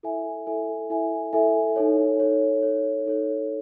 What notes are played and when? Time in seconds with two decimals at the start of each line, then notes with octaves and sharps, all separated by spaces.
0.03 E4 A4 E5 G#5
0.47 E4 A4 E5 G#5
0.90 E4 A4 E5 G#5
1.33 E4 A4 E5 G#5
1.76 D#4 A4 C#5
2.20 D#4 A4 C#5
2.63 D#4 A4 C#5
3.06 D#4 A4 C#5